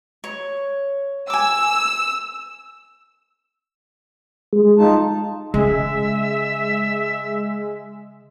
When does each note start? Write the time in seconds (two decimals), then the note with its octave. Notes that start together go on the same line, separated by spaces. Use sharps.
0.24 C#5
1.30 G#5 D6 E6
4.53 G#3
4.78 D#4 F4 A5
5.54 C#3 G#3 E5